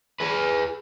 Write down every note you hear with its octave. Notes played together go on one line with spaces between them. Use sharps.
G#4 B4